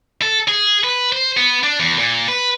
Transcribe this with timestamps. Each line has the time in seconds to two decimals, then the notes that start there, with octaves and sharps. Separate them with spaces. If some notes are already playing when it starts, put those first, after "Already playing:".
0.22 A4
0.48 G#4
0.84 B4
1.12 C5
1.37 B3
1.63 D4
1.80 E2
1.99 A#2
2.28 B4